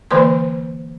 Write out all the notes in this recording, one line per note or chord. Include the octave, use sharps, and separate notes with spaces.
D3 E3 A#3 B4 C5 C6